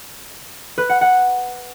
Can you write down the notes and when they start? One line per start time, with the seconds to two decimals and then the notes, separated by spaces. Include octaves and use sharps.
0.78 B4
0.89 F#5
1.01 F#5